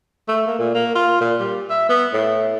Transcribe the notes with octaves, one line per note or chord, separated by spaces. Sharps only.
A3
A#3
A#2
A#3
F4
A#2
G3
E5
B3
A2